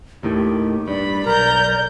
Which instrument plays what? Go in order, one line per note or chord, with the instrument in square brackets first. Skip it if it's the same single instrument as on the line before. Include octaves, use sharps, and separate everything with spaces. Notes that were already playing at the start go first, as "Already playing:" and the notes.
[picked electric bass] D#2 A2 D#3 [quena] G4
[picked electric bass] G2 [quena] D5 [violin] B5
[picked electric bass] B1 [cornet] A#4 [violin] A#5 G6